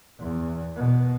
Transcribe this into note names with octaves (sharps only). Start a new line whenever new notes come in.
E2
B2